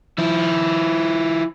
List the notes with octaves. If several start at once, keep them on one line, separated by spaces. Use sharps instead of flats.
F3 E4